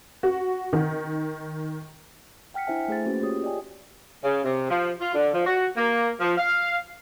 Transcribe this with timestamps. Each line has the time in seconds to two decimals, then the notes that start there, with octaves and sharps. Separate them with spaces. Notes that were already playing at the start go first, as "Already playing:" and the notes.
0.23 F#4
0.73 D#3
2.54 F#5 G5 F6 B6 C#7
2.67 D4 E4 C5 E5 G#5
2.88 A3 G#4 C5 A6
3.06 A#3 C#4 F#4 B4
3.23 F4 G4 G#4 C#5 D#6
3.44 D5 D#5 G5 G#5
4.24 C#3
4.45 C3
4.70 F3
5.00 F4
5.15 D3
5.34 F3
5.46 F#4
5.77 A#3
6.19 F3
6.38 F5